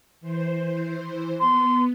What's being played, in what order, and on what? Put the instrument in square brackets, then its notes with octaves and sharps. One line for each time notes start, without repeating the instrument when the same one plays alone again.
[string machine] E3 C5
[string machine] B3 [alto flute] C6